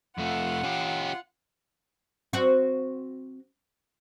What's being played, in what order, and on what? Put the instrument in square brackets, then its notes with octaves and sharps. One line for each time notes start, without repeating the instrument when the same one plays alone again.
[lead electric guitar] F2 A3 [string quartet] F4 F#5
[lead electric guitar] C#4 G4
[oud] C4 F#4